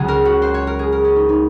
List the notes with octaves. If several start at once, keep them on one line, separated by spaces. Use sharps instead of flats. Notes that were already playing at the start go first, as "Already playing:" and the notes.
Already playing: C#2 C#3 F#3 G#4
A#4
F#4
C5
C#5
A#4
G#4
A#4
C#4
D#4
D#4